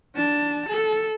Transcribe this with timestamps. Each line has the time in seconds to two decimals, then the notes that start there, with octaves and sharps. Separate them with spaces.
0.15 D4 A5
0.68 A4